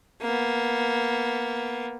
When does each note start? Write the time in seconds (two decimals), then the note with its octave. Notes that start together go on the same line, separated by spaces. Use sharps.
0.22 A#3 B3